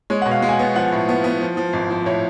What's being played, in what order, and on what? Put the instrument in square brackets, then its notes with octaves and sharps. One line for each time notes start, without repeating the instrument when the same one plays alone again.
[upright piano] G#3 [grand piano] C#5
[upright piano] B2 [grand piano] F#5
[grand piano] F5
[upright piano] G#3
[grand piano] G#5
F#5
[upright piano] B3
[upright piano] F3 [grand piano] F#5
[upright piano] A2
B3
B3
F3
F3
G#1
F3
[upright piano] A2 [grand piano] C#5